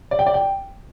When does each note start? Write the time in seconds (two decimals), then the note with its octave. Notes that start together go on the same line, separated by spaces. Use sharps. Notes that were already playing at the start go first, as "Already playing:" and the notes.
0.11 D5
0.19 G5
0.26 D5
0.34 G5